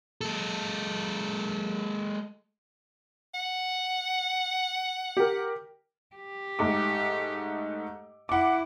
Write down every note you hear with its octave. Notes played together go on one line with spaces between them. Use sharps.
G#3 A4
F#5
G4 A#4
G4
G#2 A3 D6
E4 F#5 D6